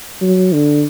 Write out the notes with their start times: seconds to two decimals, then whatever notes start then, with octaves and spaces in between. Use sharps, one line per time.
0.22 F#3
0.53 D3